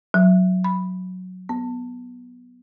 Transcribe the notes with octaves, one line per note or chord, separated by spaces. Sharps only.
F#3
B5
B3